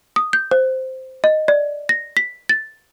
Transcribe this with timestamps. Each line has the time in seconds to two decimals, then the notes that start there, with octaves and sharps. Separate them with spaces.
0.16 D#6
0.33 G6
0.51 C5
1.24 D#5
1.48 D5
1.89 A#6
2.17 B6
2.49 A6